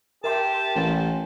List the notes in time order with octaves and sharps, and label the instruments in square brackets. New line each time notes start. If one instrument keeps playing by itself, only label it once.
[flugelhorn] G4 [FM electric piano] A#4 E5 C6 [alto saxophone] A5
[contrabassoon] A1